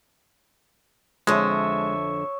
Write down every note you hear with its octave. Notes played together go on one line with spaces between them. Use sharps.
F2 D3 G#3 C#5 E5